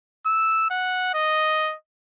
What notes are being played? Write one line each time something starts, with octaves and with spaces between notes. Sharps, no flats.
E6
F#5
D#5